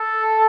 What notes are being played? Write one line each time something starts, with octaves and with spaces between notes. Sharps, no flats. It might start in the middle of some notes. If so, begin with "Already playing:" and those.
Already playing: A4